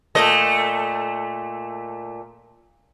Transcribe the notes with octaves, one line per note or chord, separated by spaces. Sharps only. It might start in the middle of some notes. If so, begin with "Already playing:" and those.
A#2 A3 D#5